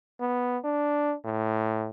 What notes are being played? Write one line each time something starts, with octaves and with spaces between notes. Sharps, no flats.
B3
D4
A2